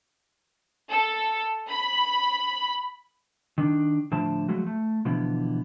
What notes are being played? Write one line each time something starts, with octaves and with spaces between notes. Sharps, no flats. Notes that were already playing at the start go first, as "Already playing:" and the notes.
A4
B5
D#3 D4
A2 D3 F3 A5
F3 F#3 G#3 A3 F#4
A3
B2 D3 E3 F3 B3